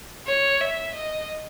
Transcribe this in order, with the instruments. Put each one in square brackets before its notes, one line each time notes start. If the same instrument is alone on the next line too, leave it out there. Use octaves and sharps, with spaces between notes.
[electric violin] C#5
E5
D#5